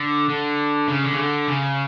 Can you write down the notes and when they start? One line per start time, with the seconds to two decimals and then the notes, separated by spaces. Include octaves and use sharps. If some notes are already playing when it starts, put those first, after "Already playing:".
Already playing: D3
0.30 D3
0.89 C#3
1.04 D3
1.14 C#3
1.19 D3
1.48 C#3